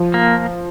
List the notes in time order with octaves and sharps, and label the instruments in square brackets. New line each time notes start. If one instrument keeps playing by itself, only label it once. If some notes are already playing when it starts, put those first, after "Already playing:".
Already playing: [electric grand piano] F3
[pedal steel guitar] A#3